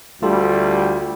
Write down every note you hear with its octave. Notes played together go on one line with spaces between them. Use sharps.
D2 G3 A3 F4 A4